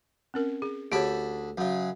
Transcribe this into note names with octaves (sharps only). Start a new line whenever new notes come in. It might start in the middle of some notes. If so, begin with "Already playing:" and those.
C4 C#4 A#4
G#4
D2 G4 G#4 C#5 A5 B5
F#2 C#3